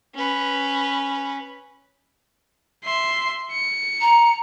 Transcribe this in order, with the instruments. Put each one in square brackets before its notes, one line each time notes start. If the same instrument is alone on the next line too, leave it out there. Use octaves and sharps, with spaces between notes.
[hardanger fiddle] C#4 B4
[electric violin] E5 C6
C#7
[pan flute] A#5